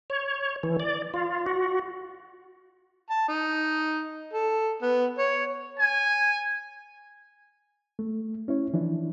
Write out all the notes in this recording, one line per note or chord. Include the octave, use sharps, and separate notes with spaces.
C#5
E3
D5
F4
F#4
A5
D#4
A4
B3
C#5
G#5
A3
C#4 E4 C#5
E3 F3 D4 E4